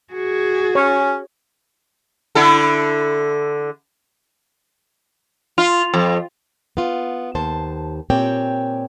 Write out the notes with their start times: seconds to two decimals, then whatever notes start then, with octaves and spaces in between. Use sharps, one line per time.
0.13 F#4 G#4
0.75 C#4 C#5
2.35 D3 E4 A4
5.58 F4
5.94 F2
6.77 B3 F4
7.35 D#2 C5 A5
8.10 A#2 C4 G4 C#5 G5